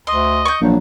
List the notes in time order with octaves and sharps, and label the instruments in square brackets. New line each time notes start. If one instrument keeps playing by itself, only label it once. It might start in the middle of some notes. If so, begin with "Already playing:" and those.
[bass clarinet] D2 [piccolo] D#5 [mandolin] C6
[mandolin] C#6 G6
[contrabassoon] A#1 [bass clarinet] F#3